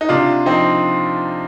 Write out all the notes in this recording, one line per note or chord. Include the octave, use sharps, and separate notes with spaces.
D#4
C3 D4 F4
F3 C4 D#4